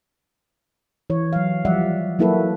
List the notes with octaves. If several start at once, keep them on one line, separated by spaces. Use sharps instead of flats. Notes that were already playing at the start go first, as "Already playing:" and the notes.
E3 C#5
F#3 F5
F3 G3 D5 E5 F#5
F#3 A#3 E4 F#4 A4 B4